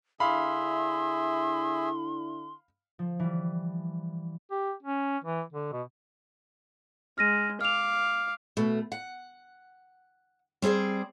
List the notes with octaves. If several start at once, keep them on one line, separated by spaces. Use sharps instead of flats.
D3 D4 E4 G#4 E5 F5 B5 C6
F3
E3 G3
G4
C#4
E3
D3
B2
G#3 F6 A#6 D#7
F5 D6 F6 F7
B2 A3
F#5
G3 C4 G#4 C5 D5